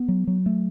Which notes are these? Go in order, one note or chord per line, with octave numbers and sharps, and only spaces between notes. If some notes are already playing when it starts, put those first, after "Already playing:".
Already playing: B3
F#3
F#3
A3